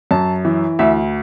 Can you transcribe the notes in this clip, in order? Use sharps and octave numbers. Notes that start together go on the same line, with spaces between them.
F#2 A5
E3
D2 E5